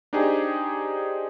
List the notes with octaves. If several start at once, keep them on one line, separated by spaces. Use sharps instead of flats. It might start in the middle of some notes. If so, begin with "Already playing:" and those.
D4 D#4 G4 G#4 C5